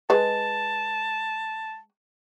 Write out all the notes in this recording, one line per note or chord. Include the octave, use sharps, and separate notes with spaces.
G#3 B4 A5